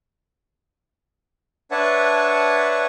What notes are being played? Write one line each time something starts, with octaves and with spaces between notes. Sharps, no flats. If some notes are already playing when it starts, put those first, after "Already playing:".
D4 B4 C#5 E5 F#5 A5